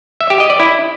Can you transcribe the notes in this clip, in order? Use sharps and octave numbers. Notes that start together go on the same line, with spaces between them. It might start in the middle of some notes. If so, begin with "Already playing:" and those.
E5
G4
D#5
D5
E4